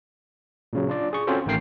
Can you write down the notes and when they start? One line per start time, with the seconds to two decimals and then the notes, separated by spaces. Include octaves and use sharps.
0.73 A#2 C#3 F#3
0.88 D4 F4 D5
1.13 G#4 C#6
1.27 C4 C#4 F4 F#4 A4 C5
1.46 A1 D#3 A3 A#4 G5 C7